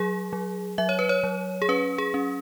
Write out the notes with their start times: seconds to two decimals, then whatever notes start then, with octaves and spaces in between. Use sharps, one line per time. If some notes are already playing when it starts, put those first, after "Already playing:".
Already playing: F#3 G#4
0.33 F#3
0.78 F#3 E5
0.89 C#5
0.99 B4
1.09 C#5
1.24 F#3
1.62 G#4
1.69 C#4 B4
1.98 G#4
2.14 C#4